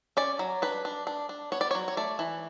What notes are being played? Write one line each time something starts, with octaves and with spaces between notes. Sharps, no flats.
C#4 D5
F#3
D4 B4
D4
D4
D4
B3 C#5
D5
C#5
F#3
C#5
A3 D5
E3